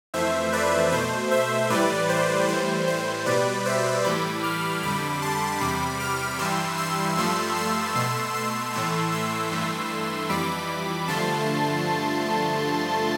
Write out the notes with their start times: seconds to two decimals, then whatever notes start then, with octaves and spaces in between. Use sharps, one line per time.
0.14 F2 E3 A3 C5 E5
0.53 B4 D5
0.92 B2 A3 C5
1.31 C5 E5
1.70 A2 E3 G3 B4 D5
2.09 C5
2.49 A2 E3 G3 C5
2.88 C5
3.26 B2 G3 B4 D5
3.65 C5 E5
4.04 A2 E3 G3 B5 D6
4.43 D6 F6
4.83 F2 D3 G3 B5 D6
5.22 A5 C6
5.61 E2 C3 G3 B5 D6
6.00 D6 F6
6.39 G2 E3 G3 C6 E6
6.78 C6 E6
7.17 G2 F3 A3 C6 E6
7.56 C6 E6
7.95 B2 A3 C6 E6
8.35 C6 E6
8.73 A2 E3 A3 C6 E6
9.12 C6 E6
9.52 G2 E3 A3
10.29 F2 E3 G3 B5 D6
11.08 G2 D3 F3 A3 A5 C6